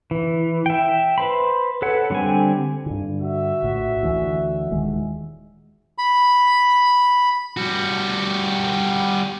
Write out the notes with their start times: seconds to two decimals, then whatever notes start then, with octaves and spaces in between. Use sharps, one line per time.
0.11 E3
0.66 E5 G5
1.18 B4 C5 B5
1.82 A4 B4 C#5 F#5
2.10 D3 G3 B3 C4 G#5
2.86 G2 D3
3.20 F#4 E5
3.63 A#1 A2
4.03 D2 E3
4.71 D#1 D#3 G#3
5.98 B5
7.57 G3 F#4